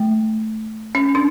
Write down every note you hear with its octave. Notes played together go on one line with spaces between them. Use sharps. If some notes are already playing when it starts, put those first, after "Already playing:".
Already playing: A3
C#4
D4